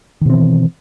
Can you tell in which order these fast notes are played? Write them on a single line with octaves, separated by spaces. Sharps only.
D#3 B2 C4 E3